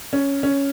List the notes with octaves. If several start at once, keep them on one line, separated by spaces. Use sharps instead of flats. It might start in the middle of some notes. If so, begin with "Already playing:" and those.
C#4
C#4